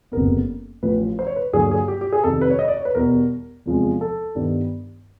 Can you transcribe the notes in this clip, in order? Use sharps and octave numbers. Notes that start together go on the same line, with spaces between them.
F#1 F2 D3 G3 B3 A#4
A1 A2 F3 B4
C5
C#5
B4
G2 D3 F#3 A#3 G#4
G#4
G4
G4
G#4
F2 C3 D#3 G3 A4
B4
C#5
D#5
D5
C#5
B4
E2 B2 G3 A#4
E2 C3 F3 G#3
A4
G2 D#3 G3 B3 D#4